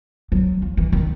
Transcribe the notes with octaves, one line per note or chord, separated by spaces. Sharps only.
F#3
F3
E3
D#3